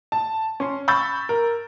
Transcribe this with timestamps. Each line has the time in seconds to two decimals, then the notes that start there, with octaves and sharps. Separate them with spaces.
0.12 A5
0.60 C#4 C6
0.88 B5 C#6 E6 G6 A6
1.29 A#4